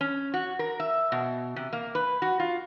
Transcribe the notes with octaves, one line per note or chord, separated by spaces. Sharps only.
C#4
F#4
A#4
E5
B2
C3
A#3
B4
F#4
F4